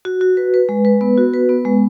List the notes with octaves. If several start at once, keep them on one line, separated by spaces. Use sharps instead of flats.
F#4
F#4
B4
B4
G#3
B4
B3
F#4
B4
B3
G#3